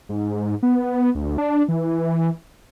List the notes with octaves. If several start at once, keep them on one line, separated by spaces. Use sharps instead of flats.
G#2
B3
D2
D4
E3